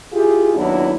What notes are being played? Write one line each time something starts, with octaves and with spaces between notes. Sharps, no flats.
E4 F4 G4 G#4
D#2 F#3 B3 D4 E4